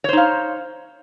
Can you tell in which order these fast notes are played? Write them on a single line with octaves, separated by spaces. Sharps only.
C#5 C5 D#4 F5